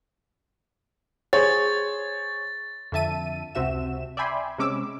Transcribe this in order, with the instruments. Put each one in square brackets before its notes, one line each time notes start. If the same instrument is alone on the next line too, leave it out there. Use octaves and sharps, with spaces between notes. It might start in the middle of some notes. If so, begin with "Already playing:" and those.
[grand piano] G#4 C5 C#5 [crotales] A6
[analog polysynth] F2 D3 E5 A5 D#7
C#2 C3 C4 F#4 E5 E7
D5 E5 G5 G#5 B5 C6
C3 G#3 C#4 D6 E6